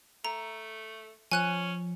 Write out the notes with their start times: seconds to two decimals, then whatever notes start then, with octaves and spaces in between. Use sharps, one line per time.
0.25 A3 A#5
1.32 F3 C#4 G#5 F#6 D#7